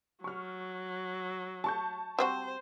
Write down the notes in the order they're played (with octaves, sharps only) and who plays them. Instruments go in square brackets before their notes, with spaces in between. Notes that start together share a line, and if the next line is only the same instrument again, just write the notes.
[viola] F#3 [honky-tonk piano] C#6 F6
[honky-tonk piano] A5 C#6 G6
[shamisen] G3 C4 F#4 [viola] C5